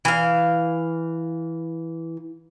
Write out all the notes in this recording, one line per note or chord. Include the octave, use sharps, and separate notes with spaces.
E3 F5